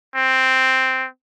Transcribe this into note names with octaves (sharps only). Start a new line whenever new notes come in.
C4